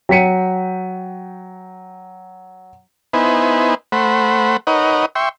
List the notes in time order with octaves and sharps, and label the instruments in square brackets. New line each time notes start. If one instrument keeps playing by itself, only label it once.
[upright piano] F#3 G5 B6 C#7 D#7
[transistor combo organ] B3 D#4 E4 B4 C5 G#5
A3 C5 F#5 B5
D#4 A#4 B4 C#5 D#5 F#5
E5 G5 C6 C#6